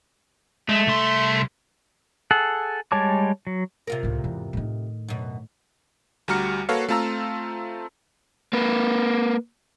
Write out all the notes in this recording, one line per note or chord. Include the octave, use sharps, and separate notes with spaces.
G#3 A3
C2 C6
G#4 A4 F#5
G3 G#3 C#5 A5 D6
F#3
C3 F4 A#4
C#2 A2
E2 G#2
A2 D#3
F#2 B2
D2 G3 F#4 A#5 F6 C#7
A#3 F#4 A4 B4 C#5 F5
A3 C4 F4 A5 A#5 E6
A#3 B4